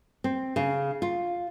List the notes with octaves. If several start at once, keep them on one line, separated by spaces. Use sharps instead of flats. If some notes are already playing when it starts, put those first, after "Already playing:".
C4
C#3
F4